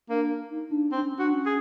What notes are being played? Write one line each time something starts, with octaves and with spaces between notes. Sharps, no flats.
A#3 D4
D#4
D4
C4 D4
C#4
D4 F#4
C#4
G#4